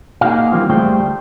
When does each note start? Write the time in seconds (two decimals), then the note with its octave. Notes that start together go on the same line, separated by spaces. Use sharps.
0.21 A#3 D#4 F#4 G#4 F5
0.52 E3 F3 G3 A#3 C4 F4
0.69 D2 G3 A3 G#4 C5 G5